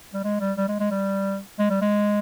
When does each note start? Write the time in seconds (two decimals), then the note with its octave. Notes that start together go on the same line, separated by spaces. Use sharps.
0.14 G3
0.24 G#3
0.40 G3
0.57 G3
0.68 G#3
0.80 G#3
0.91 G3
1.59 G#3
1.70 G3
1.82 G#3